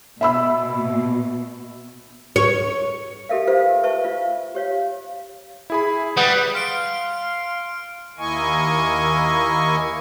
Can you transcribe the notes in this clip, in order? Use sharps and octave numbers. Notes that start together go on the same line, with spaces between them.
B2 E5 B5 E6
C#5
G4 A4 A#4 E5 F5
F4 G4 A4 B4 C5 F5
B4 E5 A5 C#6
F4 F5
G4 C#5 F5
E4 G#4 B5
G3 B4 F#5 D#6
F5 C6 F6 D7
D#2 A#3 E4 D#5 G#5 C#6